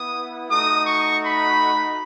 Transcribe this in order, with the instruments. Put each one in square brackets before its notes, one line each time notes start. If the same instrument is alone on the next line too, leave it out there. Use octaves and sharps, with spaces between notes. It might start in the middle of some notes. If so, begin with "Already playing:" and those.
Already playing: [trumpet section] B3 E4 D#6
A3 D#4 F#4 D#6
C#6
B5